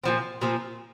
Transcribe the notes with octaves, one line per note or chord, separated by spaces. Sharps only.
A#2 F3 C4
A#2 F3 C4